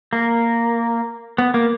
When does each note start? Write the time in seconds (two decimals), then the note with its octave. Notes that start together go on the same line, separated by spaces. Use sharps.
0.13 A#3
1.38 B3
1.54 A#3